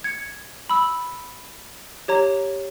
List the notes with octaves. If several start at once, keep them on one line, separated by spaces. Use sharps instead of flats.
G#6 C#7
B5 E6
G4 C#5 A#5